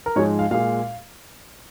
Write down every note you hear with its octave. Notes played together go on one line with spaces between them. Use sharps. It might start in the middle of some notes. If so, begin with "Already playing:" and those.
A#4
G#2 F3 G#3 C#5
F5
A#2 G#3 F5